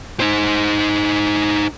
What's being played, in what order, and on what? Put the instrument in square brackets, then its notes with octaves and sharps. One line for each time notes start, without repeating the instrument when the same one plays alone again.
[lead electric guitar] D#4 C5